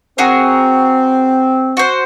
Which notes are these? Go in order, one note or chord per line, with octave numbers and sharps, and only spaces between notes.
C4 F#4 G#4 A#4
F#4 C5